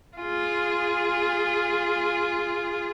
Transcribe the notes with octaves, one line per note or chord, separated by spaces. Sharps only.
F4 G#4